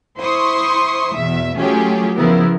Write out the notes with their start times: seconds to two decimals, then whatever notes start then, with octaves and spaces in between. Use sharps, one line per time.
0.19 E4 C5 C6 C#6 D#6
1.14 E2 B2 E5
1.57 F#3 A3 C#4 F4 G4 G#4
2.16 C#3 F3 B3 E4 A#4